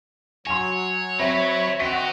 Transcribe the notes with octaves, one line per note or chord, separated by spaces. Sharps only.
F#3 C#5 G#5 C6
F#3 C4 C#5 E5 B5 A#6
C4 F#4 A#4 D#5 B6 C#7